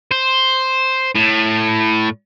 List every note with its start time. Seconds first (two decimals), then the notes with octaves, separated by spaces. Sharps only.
0.12 C5
1.15 A2